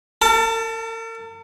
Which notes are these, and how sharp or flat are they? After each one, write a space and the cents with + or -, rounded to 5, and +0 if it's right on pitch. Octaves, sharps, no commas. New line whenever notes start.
A#4 -45 A5 +15